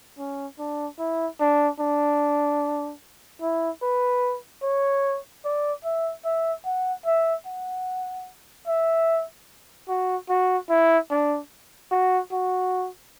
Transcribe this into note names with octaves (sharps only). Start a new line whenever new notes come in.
C#4
D4
E4
D4
D4
E4
B4
C#5
D5
E5
E5
F#5
E5
F#5
E5
F#4
F#4
E4
D4
F#4
F#4